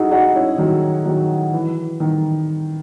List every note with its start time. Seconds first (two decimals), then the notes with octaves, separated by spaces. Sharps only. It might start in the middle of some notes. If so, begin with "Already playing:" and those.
Already playing: D#4 E4 F#4 G#4
0.11 D#4 F#4
0.35 C#4 E4
0.58 D#3 F#3
1.05 D#3 F#3
1.53 E3
2.00 D#3